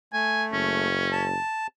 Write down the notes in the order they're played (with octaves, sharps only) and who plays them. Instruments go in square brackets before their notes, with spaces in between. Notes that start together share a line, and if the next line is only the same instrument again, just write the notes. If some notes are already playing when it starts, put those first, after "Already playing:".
[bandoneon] A3 [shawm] G#5
[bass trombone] F#1 [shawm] C#4
[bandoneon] A5